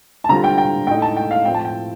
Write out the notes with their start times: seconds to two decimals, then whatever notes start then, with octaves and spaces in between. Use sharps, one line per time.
0.24 A5
0.29 D3 G3 C4 F4 A#5
0.44 G5
0.58 G5
0.87 A2 A3 D#4 G5
1.02 A5
1.17 G5
1.31 F5
1.45 A2 F3 C4 G5
1.54 A5
1.65 G5